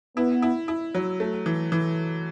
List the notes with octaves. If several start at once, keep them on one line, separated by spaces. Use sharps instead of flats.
B3 E4
E4
E4
F#3
A3
E3
E3